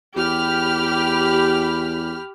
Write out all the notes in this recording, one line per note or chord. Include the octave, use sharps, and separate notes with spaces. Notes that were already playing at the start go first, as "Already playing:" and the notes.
E2 G4 B5 F6